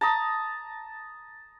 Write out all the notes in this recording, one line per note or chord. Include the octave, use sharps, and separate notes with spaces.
A5 A#5 D#6